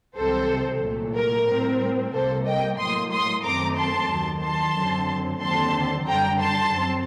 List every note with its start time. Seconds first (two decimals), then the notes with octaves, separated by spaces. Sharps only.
0.17 C2 C3 D#3 F#3 C4 A4 C5
0.82 C2 A#2 F#3 A3
1.14 A#4
1.48 A2 G3 C4
2.13 C2 C3 G3 A#3 A4 C5
2.46 D#5 G5
2.79 A2 F#3 A#3 C6 D#6
3.12 C6 D#6
3.44 F#2 D#3 A3 C4 A#5 D6
3.77 A5 C6
4.10 D#2 D#3 F#3
4.43 A5 C6
4.75 F#2 D3 F#3 C4
5.41 D#2 D3 F#3 C4 A5 C6
6.06 F#2 D3 G3 G5 A#5
6.40 A5 C6
6.72 F#2 F#3 C4